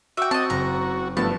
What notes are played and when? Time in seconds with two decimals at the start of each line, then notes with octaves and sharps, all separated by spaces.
0.17 F#4 E5 G5 D6
0.31 C4 D#5 A5
0.50 F#1 A#5
1.17 G2 F3 A3 B3 A5